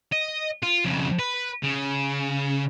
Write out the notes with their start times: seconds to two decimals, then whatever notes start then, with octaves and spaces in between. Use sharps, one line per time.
0.12 D#5
0.63 F4
0.85 F2 C#3
1.19 B4
1.63 C#3